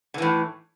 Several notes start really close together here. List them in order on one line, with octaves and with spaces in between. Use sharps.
D3 E3 A2